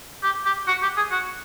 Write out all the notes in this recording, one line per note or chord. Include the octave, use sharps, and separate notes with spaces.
G4
G4
F#4
G4
G#4
F#4